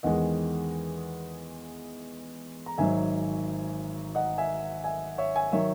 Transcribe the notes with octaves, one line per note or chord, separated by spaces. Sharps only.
E2 D#3 G#3 D#5 F#5
A#5
G#1 G#2 F#3 E5 G#5
D#5 F#5
E5 G#5
E5 G#5
C#5 E5
E5 G#5
D#3 F#3 C#5 E5